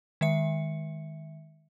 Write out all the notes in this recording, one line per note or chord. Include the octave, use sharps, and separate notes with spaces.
D#3 G#3 E5 C#7